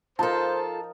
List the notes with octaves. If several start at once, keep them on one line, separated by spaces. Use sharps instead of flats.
F3 D#4 F4 A4 A#4 C5 A5